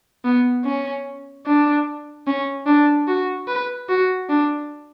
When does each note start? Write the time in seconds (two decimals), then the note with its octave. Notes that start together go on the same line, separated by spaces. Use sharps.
0.24 B3
0.65 C#4
1.46 D4
2.27 C#4
2.66 D4
3.08 F#4
3.47 B4
3.89 F#4
4.30 D4